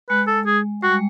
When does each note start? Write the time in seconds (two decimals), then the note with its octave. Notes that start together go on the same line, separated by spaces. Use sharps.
0.09 G#3 B4
0.27 A4
0.46 G#4
0.82 G3 F#4
0.92 G#3